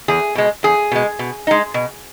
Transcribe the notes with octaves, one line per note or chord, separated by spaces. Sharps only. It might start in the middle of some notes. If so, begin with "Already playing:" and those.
E2 G#4
B2 G#3
E2 G#4
B2 G#3
B2
G#3 D#4
B2